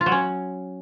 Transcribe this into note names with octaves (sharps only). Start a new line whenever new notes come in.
F4
F#3
C#4